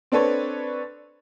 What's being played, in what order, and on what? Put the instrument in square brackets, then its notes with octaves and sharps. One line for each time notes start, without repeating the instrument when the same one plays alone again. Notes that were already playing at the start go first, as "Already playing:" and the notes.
[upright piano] C4 D4 A4 B4 C#5